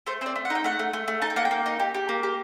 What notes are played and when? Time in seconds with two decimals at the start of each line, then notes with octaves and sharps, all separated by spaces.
0.07 A3 C5
0.21 C4 C5
0.26 D5
0.36 A3
0.45 F#5
0.50 D#4
0.55 G5
0.64 A3 F#5
0.79 A3
0.93 A3
1.08 A3
1.22 D#4 A5
1.30 G5
1.36 A#3 F#5
1.45 G5
1.51 A#3
1.66 D#4
1.80 G4
1.95 G4
2.09 A#3
2.23 G4